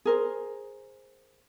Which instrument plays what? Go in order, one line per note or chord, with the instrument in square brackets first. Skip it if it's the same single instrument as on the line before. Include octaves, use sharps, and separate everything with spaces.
[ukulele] G#4 A#4 C5